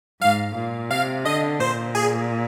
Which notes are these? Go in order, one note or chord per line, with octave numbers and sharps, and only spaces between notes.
G#2 F5
A#2
C3 F5
D3 D#5
A#2 C5
G#4